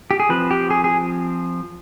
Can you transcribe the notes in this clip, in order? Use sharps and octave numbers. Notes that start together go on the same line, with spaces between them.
G4
G#4
F3 C4 B4
G4
G#4
G#4